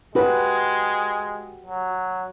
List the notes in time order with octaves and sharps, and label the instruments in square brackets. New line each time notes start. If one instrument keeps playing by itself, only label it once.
[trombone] G#3 [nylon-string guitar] F#4 G4 B4
[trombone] F#3